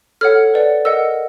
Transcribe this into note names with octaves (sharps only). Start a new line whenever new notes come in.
A4 C#5 F#5 F6
B4 D5 F#5
A#4 D#5 F#5 E6